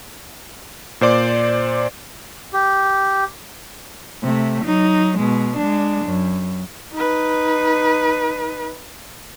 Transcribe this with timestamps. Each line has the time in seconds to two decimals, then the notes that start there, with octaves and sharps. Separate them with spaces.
1.01 A#2 C5 D5 D6
2.53 G4
4.23 C3 A3
4.64 F#3 D#4
5.19 B2 G#3
5.57 G#3 D4
6.05 F#2
6.93 D#4 B4